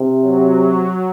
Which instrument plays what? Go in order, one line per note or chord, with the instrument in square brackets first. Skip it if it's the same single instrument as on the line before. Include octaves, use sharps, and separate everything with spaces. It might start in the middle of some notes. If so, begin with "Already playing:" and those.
Already playing: [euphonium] C3
[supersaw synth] F#3